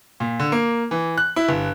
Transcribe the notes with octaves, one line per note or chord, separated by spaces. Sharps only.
A#2
D3
A#3
E3
F#6
E4
G1